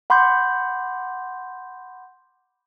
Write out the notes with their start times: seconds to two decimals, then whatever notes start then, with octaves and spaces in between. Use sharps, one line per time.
0.10 F#5 B5 C6 D6 G6